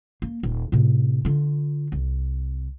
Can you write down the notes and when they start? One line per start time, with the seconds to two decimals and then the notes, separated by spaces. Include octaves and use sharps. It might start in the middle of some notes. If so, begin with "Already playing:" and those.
0.22 A#3
0.43 D#1
0.72 A2 C3
1.25 D3 F4
1.92 C2